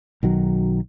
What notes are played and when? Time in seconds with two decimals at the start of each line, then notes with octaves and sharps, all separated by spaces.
0.23 B1 D#3 F#3